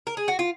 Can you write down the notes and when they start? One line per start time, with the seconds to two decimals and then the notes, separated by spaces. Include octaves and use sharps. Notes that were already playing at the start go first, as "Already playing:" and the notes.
0.07 A#4
0.17 G#4
0.28 F#4
0.39 F4